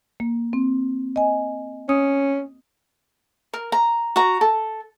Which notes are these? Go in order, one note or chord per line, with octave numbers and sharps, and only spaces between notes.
A#3
C4
D#5 G#5
C#4 D#6
A#4
A#5
F#4 A#5
A4